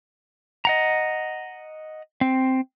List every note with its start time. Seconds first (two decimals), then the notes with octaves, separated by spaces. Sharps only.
0.65 D#5 F#5 A#5
2.21 C4